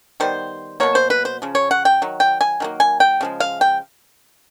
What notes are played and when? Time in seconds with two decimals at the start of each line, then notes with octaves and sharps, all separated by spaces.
0.20 D#3 G3 B3 C5
0.80 B2 F#3 A#3 C#5
0.95 C5
1.10 B4
1.25 C5
1.42 C#3 F3
1.55 C#5
1.71 F#5
1.85 G5
2.02 D#3 F#3
2.20 G5
2.41 G#5
2.60 D#3 F#3 A#3
2.80 G#5
3.00 G5
3.21 C#3 F3 G#3
3.40 F5
3.61 G5